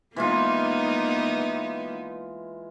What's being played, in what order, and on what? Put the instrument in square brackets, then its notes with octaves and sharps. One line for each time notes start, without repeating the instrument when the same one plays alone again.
[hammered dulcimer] E3 G#3 F4 [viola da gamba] A#3 B3 D#4